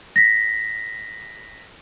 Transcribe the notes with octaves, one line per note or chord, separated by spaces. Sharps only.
A#6 B6